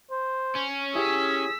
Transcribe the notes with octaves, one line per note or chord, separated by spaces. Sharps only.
C5
C#4
E4 G4 G#4 C#5 E6 B6